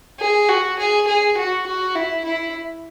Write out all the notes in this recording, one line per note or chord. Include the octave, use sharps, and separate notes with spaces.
G#4
F#4
G#4
G#4
F#4
F#4
E4
E4